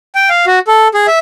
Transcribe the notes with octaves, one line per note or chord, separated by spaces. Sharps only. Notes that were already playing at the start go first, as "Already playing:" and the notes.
G5
F5
F#4
A4
G#4
E5